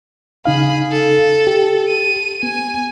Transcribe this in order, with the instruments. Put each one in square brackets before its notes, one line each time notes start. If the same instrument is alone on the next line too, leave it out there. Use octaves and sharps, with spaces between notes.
[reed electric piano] C#3 D#4 F5 [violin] G#4 B5
[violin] A4
[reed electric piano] G4
[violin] D#7
[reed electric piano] B3 [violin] G#5